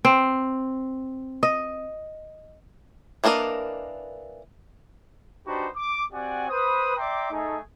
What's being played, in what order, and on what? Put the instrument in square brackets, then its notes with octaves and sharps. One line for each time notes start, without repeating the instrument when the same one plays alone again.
[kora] C4
D#5
[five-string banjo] E3 A#3 D4 A#4 D#5
[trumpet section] D4 D#4 F#4 G4 B4 C5
D6
C4 F#4 G4 D5 F#5 G#5
B4 C5 D#6
D5 E5 G5 A#5 C6 D6
A3 D#4 G#4